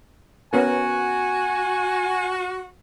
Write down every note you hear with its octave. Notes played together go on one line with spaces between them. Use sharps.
B3 C#4 F#4 A#4 G#5